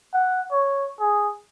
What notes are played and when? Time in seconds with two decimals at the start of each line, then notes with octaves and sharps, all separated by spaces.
0.14 F#5
0.52 C#5
1.00 G#4